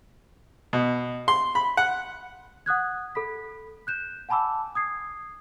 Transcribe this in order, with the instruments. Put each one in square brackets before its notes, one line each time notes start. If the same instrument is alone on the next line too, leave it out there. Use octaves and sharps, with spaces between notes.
[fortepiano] B2
C6
B5
F#5
[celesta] F#5 D#6 F#6 G#6
A4 B5 B6
F#6 G6 E7
F#5 G#5 A5 B5 D6 E6
D#6 G#6 C7